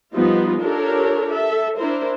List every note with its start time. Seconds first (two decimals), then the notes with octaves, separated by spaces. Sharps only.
0.14 F3 G3 B3 D#4 F4
0.60 D4 F4 G4 A4 A#4 C#5
1.31 A4 E5
1.76 D4 E4 A#4 C5